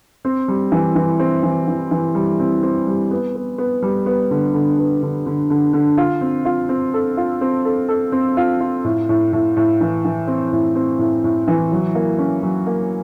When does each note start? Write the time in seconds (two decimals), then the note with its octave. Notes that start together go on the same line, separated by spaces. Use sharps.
0.25 C4
0.48 G3
0.72 E3
0.95 E3
1.19 C4
1.43 E3
1.68 E3
1.91 E3
2.15 G3
2.40 C4
2.63 C4
2.87 G3
3.11 B3
3.35 B3
3.58 B3
3.82 G3
4.06 B3
4.31 D3
4.54 D3
4.78 B3
5.03 D3
5.26 D3
5.50 D3
5.73 D3
5.97 F4
6.21 C4
6.45 F4
6.69 C4
6.94 A4
7.17 F4
7.41 C4
7.65 A4
7.88 A4
8.12 C4
8.37 F4
8.60 F4
8.84 A2
9.09 A2
9.33 A2
9.57 A2
9.81 E3
10.05 E3
10.27 C4
10.52 A2
10.75 C4
10.99 A2
11.24 A2
11.48 E3
11.72 F#3
11.95 A#3
12.19 C#4
12.43 F#3
12.66 A#3